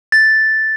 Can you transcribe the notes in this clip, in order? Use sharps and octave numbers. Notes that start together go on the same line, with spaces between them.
A6